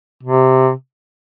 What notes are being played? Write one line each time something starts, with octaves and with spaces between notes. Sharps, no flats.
C3